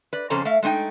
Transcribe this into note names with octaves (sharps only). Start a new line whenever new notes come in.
B4 D5
F2 C#3 C#4 A4 C5 A#5
A3 E5 F5
G#3 A3 C4 D#4 G5